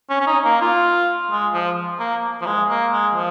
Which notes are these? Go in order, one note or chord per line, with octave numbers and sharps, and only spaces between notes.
C#4
C#4
D#4
A#3
F4
G#3
F3
A#3
F3
G#3
A#3
G#3
F3